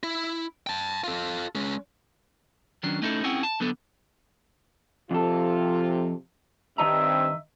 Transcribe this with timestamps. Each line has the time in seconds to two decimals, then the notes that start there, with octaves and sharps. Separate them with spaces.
0.03 E4
0.67 G5 A5
1.04 F4 A4
1.55 G#3 C#4
2.83 D#3 F#3 C#4 D4
3.02 A3 C#4 D#4 E4 G4 A4
3.24 C4 C#4 E4 G#4 F#5 G5
3.43 A5
3.60 D3 F#3 B3 A4
5.11 F2 C3 F4 A4
6.78 G2 D#3 C4 D#5 E5 A#5